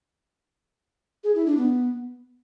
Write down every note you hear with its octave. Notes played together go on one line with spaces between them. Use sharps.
G#4
E4
D4
B3